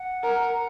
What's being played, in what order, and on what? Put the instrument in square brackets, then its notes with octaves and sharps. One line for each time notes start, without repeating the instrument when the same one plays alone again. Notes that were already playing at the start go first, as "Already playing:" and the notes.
Already playing: [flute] F#5
[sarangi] A#4